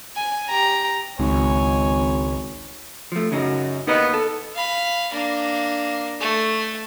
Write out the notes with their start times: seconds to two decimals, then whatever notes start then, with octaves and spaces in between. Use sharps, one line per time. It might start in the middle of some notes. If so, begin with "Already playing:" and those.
0.16 G#5
0.49 G4 A#5
1.19 G#1 C#2 C#5 G#5
3.12 F3 A3
3.32 F#2 C#3 D#4
3.87 D#2 B3 D#4 A#4 D#5
4.14 A4
4.55 F5 B5
5.13 A#3 D4
6.21 A3